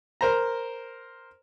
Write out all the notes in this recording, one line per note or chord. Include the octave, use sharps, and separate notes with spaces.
A#4 C5 A#5